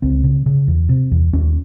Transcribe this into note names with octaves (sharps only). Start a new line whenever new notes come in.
C#2 C4
C#3
C#3
E2
C3
E2
D#2 C#4